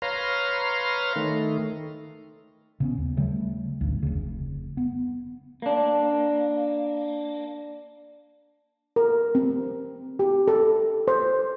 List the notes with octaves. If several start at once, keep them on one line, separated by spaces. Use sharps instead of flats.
B4 C#5 F5 A#5 C6
D#3 A3
C#3 B3 C#4
D#2
C#3 F#3 G3 A3
A1 D2
F1 C#3
B3
A#3 D4
A#4
C4
G4
A4
C5